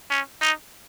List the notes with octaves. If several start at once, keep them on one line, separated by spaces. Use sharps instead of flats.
C#4
D#4